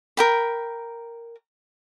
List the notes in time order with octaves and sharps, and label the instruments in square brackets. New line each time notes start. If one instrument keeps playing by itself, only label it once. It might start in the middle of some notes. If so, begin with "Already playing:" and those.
[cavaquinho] A#4 G5 B5